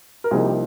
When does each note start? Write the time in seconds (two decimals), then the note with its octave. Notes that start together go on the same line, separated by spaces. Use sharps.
0.24 A#4
0.31 C2 C3 F3 A#3 D#4 G#4
0.44 G4